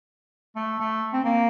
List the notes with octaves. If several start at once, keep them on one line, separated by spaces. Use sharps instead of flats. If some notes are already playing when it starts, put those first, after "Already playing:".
A3
A3
C4
A#3